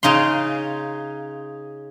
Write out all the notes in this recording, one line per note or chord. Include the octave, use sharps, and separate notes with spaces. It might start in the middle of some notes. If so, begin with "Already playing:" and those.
C#3 D#4 F5 C6